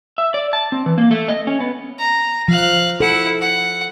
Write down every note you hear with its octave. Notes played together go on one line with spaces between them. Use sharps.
E5
D5
A5
C4
E3
A#3
A3
D#5
C#4
B3
A#5
F3 F5 F#6
E4 A4 F#5
F#5